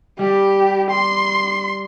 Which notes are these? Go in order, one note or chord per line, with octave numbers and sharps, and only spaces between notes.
G3 G4
C6